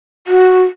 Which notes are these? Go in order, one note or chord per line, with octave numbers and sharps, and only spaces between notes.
F#4